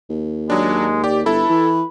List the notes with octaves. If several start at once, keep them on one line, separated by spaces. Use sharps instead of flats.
D#2
F#3 G#3 D4
G4 D5
G1 E4 A4 B4
E3